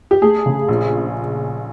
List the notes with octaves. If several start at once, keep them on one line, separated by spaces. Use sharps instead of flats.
G4
A3 G#4
C#3
A#1